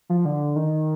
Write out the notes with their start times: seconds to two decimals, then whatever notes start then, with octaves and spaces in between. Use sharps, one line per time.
0.10 F3
0.25 D3
0.56 D#3